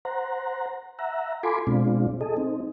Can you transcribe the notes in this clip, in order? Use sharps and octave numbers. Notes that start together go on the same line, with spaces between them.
C5 F#5 A#5
E5 F#5 A#5
F4 A4 G#5 B5 C6 D6
B2 G#3 C4 D4 F4
G#4 A4 D#5
C4 D#4